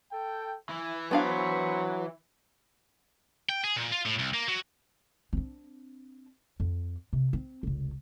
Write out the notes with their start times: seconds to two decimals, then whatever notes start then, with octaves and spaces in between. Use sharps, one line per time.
0.12 A4 G5
0.69 E3 E4
1.11 F#3 B3 D4 C5 F5 B5 C#6
3.49 G5
3.64 G#4
3.76 A#2
3.92 F4
4.05 A2
4.19 C2
4.34 A#3
4.48 F#3
5.33 C4 D4
6.60 F2
7.13 C3
7.33 C4
7.63 F1 C#2